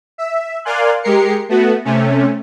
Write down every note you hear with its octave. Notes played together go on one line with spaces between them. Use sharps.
E5
A#4 D5 F5 G#5 C6 F#6
G#3 G4 A#4 C7 C#7
A3 B3 F#4
C3 A3 C#4